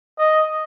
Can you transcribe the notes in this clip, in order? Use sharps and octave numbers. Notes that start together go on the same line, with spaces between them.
D#5